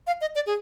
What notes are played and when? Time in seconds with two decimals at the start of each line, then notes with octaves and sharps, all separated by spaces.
0.07 F5
0.21 D#5
0.35 D5
0.46 G#4